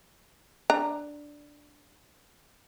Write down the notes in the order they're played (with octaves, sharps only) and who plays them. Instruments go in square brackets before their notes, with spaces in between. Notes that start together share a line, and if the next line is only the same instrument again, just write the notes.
[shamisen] D4 A#5